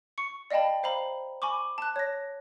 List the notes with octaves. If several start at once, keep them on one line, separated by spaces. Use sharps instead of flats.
C#6 C#7
D5 D#5 F5 G5 A5 B5
C5 F5 A#5 B5
G#5 B5 C#6 D6
A5 F#6
C#5 A#6